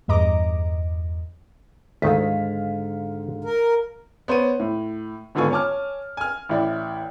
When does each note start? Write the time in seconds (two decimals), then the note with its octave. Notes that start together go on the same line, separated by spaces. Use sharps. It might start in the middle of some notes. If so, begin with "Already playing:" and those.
0.08 E2 G2 D#5 A#5 D6
2.02 D2 G#2 D3 D#3 A3 F5 B6
3.44 A#4
4.28 B3 C5 C#5 D#7
4.60 A2
5.35 G#1 D3 B3 F4 G#5 C#6
5.51 C#5 G#5 A5 D6 F6
6.17 G#5 F6
6.49 A1 E4 D5